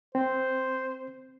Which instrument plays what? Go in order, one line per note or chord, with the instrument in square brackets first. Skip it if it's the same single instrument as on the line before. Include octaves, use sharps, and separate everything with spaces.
[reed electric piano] C4 [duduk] C5